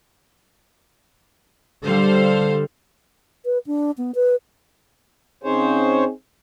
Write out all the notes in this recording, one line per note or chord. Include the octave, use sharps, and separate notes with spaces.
D3 G3 A4 C5 F5
B4
D4
B3
B4
C#3 C4 D#4 G#4 C5 C#5